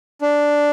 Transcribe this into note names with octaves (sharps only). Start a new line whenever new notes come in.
D4